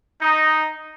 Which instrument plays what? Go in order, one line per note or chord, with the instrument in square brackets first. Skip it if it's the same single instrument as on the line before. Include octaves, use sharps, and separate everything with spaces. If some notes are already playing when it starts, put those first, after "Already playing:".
[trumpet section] D#4